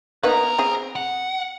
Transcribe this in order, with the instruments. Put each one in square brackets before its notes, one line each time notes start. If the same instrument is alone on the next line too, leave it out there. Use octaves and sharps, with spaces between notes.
[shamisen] A#3 B3 D#4 [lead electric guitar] B4 A#5
[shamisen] C4 G#4
[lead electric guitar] F#5